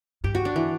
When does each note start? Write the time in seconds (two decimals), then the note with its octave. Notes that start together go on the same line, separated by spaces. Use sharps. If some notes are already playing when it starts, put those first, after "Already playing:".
0.24 G2 G4
0.35 F#4
0.45 D4
0.56 E3